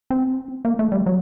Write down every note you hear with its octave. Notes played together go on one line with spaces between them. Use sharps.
C4
A#3
A3
G3
F#3